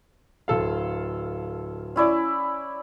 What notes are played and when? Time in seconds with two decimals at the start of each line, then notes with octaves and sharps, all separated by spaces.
0.48 D1 A4 F5
1.96 C#4 E4 D5